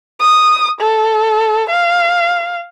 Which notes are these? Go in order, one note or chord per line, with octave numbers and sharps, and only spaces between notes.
D#6
A4
F5